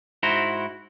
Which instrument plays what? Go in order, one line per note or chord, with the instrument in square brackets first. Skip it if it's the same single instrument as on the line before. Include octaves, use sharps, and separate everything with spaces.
[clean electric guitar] G#2 E4 F#4 C5 A#5